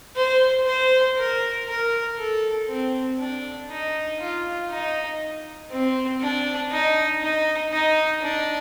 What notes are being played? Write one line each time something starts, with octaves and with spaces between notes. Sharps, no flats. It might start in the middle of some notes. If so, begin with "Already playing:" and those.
C5
C5
A#4
A#4
A4
C4
D4
D#4
F4
D#4
C4
D4
D#4
D#4
D#4
D4